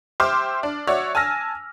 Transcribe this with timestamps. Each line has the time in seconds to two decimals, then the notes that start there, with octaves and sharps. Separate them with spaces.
0.20 G4 C5 E5 C6 D6 F6
0.63 D4
0.87 F#4 C#5 D5 E5
1.15 G#5 A5 E6 F6 A#6